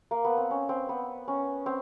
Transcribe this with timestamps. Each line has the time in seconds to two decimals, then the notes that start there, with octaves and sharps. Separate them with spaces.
0.11 A#3
0.25 B3
0.37 C4
0.51 C#4
0.69 C4
0.89 B3
1.28 C#4
1.66 C4